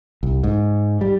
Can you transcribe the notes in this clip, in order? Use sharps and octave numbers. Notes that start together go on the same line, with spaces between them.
C2
G#2
G3